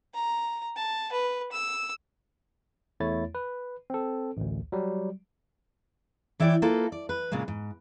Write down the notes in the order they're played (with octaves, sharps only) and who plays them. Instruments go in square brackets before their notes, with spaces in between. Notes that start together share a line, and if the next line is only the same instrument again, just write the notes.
[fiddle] A#5
A5
B4
E6
[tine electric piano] E2 A3 E4 C#5 A6
B4
C4 A4
A1 D2
F#3 G3
[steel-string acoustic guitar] E3 E4 C#5 D5 G5
A#3 F4 A4 B4
D5
B4
A#2 C#3 G#3 A#3
G#2